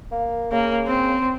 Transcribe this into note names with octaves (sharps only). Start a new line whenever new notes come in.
A#3
C#3 A#3
C4